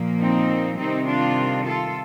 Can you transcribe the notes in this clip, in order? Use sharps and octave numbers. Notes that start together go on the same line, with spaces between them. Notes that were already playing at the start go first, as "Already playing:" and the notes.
Already playing: A#2 F3 A#3
C4 D#4
C3 D#3 G3 C4 D#4
D4 F4
F4 A4